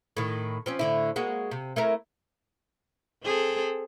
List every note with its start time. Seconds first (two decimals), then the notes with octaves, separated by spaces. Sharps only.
0.17 A2 D#3
0.66 F3 C4 C#4
0.79 A2 D3 E4
1.16 G#3 A#3 F#4
1.51 C3
1.76 A3 E4 A#4
3.23 C4 G#4 A4